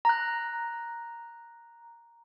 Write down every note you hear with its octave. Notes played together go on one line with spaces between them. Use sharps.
A#5 F#6